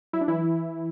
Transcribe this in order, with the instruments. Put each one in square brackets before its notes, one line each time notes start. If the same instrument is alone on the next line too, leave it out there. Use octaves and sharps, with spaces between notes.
[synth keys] F#3 E4
D4
E3 E4